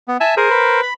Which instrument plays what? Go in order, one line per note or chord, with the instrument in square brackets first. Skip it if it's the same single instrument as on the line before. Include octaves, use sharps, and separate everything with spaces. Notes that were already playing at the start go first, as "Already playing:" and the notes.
[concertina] B3
[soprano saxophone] E5 [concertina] G#5 A5
[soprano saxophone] G#4 [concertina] A#4 C5
[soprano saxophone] B4
[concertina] B5